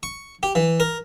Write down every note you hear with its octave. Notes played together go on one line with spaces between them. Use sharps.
C#6
G4
E3
A#4